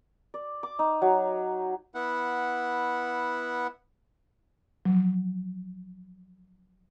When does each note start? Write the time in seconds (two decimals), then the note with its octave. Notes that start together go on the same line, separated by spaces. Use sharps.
0.34 D5
0.63 D6
0.79 D#4
1.02 F#3
1.95 B3 E4 F#5
4.85 F3 F#3